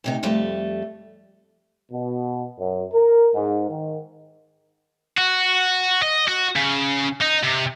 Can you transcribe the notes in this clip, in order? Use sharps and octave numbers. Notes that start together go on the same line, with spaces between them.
D2 C3 D#4
F2 G3 A3
B2
F#2
A#4
G#2
D#3
F#4
D#5
F#4
C#3
D#4
C3